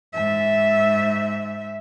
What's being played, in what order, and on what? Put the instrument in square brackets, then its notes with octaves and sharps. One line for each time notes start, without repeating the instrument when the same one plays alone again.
[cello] G#2 E5